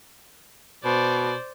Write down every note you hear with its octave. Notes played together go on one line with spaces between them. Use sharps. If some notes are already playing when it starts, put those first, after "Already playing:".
B2 C5 D5